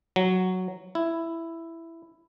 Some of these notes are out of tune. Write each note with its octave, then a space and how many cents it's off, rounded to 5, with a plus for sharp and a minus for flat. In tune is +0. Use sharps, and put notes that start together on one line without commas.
F#3 +0
E4 +5